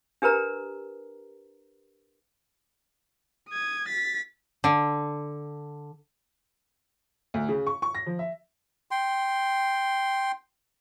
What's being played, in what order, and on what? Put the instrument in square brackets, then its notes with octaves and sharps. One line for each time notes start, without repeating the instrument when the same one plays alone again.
[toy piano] D4 G4 A#4 B4 A#5
[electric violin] D#6 G#6
A6 B6
[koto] D3
[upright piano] D2
C#3
C#6
C#6
A#6
F3
E5
[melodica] G5 C6